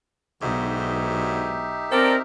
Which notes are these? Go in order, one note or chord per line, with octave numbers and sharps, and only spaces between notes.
B1 G#2 D3 D#4 F#4 G4 E5
C4 A4 A#4 D5